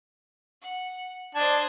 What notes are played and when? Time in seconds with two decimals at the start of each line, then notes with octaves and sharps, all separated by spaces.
0.62 F#5
1.35 D4 C5 D#5 A5 G#6